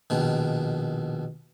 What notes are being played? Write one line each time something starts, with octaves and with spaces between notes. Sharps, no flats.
A#1 B2 D#3